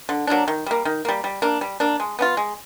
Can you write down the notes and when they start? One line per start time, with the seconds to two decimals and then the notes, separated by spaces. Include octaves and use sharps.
0.09 D3
0.27 F#3 A#3 D4
0.48 D#3
0.66 G3 A#3
0.85 D#3
1.05 G3 A#3
1.24 G3
1.42 A#3 D4
1.61 G3
1.80 A#3 D4
2.00 G#3
2.19 B3 D4 F4
2.37 G#3